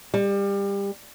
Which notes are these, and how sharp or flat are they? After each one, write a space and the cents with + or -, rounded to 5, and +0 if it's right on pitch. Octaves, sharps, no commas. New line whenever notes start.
G3 +25